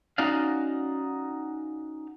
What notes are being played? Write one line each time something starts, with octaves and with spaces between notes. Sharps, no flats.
C#4 D#4 F#4 D5 F5